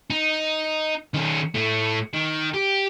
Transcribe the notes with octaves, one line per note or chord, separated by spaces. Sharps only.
D#4
D#3 C#4
A2 A3
D#3
G4